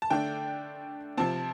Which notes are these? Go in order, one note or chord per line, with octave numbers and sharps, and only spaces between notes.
A5
D3 A3 D4 G5
C3 F3 C4 A5